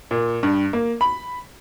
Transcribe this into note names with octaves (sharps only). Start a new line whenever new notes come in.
A#2
G2
A#3
B5